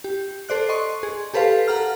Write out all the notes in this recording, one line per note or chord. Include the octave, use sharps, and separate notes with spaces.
G4
A4 C5 D5 F#6
D#5 C6 C#6
G#4
G4 A4 B4 C5 F5
A4 F#5 A#5 F6